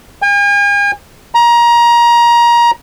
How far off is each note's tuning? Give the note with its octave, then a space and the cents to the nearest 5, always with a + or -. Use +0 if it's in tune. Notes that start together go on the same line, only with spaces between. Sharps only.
G#5 -45
A#5 +25